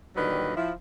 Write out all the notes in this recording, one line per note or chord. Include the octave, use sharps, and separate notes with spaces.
A#2 D3 D#3 F#3 G3 B4
F3 E4